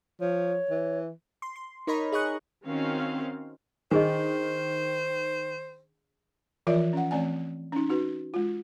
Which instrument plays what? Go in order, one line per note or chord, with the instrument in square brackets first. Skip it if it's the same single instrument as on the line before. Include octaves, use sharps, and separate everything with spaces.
[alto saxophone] F3 [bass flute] C#5
[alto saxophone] E3
[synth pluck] C6
C6
D#4 A#4 C#5 D#5 A#5 B5
G#4 D#5 C#6 F#6
[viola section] D#3 C4 C#4 F#4 F5
[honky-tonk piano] D#3 [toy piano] D4 G#4 D#5 [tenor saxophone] C5
[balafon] E3 F3 F4 A#4 D5 E5
C#4 F#5
E3 A3 C4 D5 G#5
C#4 D#4
D#4 F#4 B4
G#3 F4